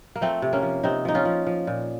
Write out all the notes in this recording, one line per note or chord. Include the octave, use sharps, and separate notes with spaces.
A#3
F3 A3 C4
C3
A#3 C#4
F3
C3 C4 D#4
F3 D#4
C#4 F4
F3
F3
A#2